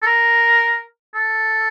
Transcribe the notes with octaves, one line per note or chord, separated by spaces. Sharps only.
A4
A#4
A4